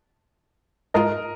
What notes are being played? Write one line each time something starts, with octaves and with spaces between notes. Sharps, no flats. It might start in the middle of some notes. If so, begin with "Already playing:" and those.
G#2 G#3 F4 A#4 D#5